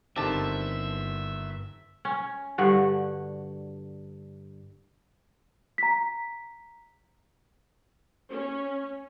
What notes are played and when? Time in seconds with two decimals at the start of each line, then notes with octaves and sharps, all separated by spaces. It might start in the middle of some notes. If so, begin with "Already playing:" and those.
0.16 G1 D3 D#3 C4 G4 E5 A5
2.05 C#4
2.58 G2 D3 F#4
5.78 A#5 B6
8.30 C#4